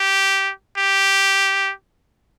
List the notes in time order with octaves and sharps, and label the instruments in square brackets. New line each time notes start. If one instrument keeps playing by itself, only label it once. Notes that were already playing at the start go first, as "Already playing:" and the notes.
Already playing: [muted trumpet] G4
G4